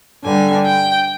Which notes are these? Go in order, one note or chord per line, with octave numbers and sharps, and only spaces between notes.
G2 D3 G3 G#5
G5